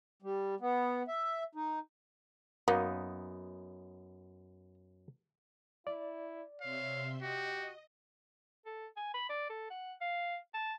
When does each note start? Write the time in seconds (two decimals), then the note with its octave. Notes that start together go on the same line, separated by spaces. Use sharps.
0.23 G3
0.60 B3
1.08 E5
1.55 D#4
2.68 F#2 A#3 B3 D#4
5.87 E4 D5
6.61 C3 C#5 E5 F5 C6
7.22 F#4 G4 D#5
8.66 A4
8.97 G#5
9.14 B5
9.29 D5
9.50 A4
9.70 F#5
10.01 F5
10.54 A5